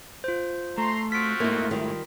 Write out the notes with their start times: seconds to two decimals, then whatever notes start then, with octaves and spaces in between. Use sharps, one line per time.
0.24 F4 C5
0.78 A3 A#5 C6
1.12 C4 F4 F#4 B6 D7
1.40 G#2 A3 A#3 E4 D#5
1.71 D#3 G3 F4